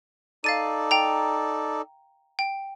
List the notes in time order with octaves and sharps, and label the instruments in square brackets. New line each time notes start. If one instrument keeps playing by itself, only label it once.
[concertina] D#4 A4 D5 [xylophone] F5 A6 D#7
[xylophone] G5 A#5
G5